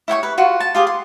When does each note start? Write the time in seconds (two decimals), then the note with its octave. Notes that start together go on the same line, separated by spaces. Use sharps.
0.08 E4 C#5 G5 C#6
0.23 B4
0.38 F4 F#4 F#5
0.60 A5
0.75 F4 G4 G#4
0.87 C6